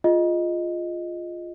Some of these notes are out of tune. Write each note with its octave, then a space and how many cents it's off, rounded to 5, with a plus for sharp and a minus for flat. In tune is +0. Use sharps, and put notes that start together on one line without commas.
F4 +0 G#4 +0 D#5 +0